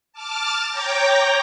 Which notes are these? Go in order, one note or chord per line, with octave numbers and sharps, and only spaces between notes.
A5 D6 F6 A6
C#5 G5 A#5 D6 G6 A#6